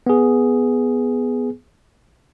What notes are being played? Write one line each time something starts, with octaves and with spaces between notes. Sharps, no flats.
B3 G#4